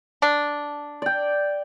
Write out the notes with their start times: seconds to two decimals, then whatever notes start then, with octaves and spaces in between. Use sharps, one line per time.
0.22 D4
1.02 D5 G5